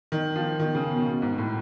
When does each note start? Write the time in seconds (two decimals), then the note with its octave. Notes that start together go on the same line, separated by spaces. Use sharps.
0.12 D#3
0.36 F3
0.59 D#3
0.75 C#3
0.91 B2
1.06 B2
1.22 G#2
1.38 A2